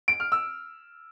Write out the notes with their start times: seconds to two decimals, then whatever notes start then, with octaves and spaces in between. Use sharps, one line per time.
0.08 D7
0.20 F6
0.32 E6